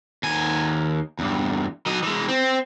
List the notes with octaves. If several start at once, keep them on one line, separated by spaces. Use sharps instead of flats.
D#2 G#5
E2 G2
F#3 D#5
E3 G#3
C4